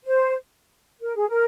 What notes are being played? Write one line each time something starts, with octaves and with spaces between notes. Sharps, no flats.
C5
A#4
G#4
A#4